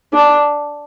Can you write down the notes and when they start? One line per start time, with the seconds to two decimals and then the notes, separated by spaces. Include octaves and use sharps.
0.13 D4